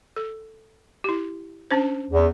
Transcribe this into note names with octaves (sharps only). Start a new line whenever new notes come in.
A4
E4 G4
C#4 D4 C5
E2